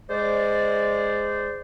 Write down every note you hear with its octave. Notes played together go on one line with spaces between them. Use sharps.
G#3 C5 D5